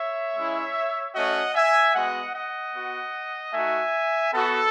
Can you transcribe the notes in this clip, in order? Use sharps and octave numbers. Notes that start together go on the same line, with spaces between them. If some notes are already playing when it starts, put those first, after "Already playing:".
Already playing: C#5 E5
G#3 C#4 E4
A3 C#4 F#4 D#5 F#5
E5 G#5
G#3 B3 F#4 D#5 F#5
D#5 F#5
B3 F#4
A3 D#4 F#4 E5 G#5
B3 F#4 A4